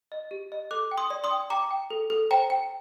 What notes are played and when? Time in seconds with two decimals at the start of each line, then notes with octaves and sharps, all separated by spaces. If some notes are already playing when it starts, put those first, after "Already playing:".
0.12 D#5
0.31 G4
0.52 D#5
0.71 A4 D6 F#6
0.91 G5
0.97 C6 D#6
1.10 D5
1.24 C6 D#6
1.31 G5
1.50 G5 A#5 D6
1.71 G5
1.90 A4
2.10 A4
2.31 C5 G5 A#5
2.50 G5